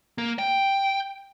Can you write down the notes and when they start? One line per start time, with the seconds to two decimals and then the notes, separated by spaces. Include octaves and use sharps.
0.18 A#3
0.39 G5